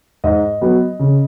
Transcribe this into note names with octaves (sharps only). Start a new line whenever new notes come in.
G#2 D#5
F#3 B3
C#3